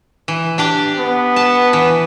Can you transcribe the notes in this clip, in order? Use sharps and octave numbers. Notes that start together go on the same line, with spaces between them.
E3
D4 G4 D5
B3
A5
E3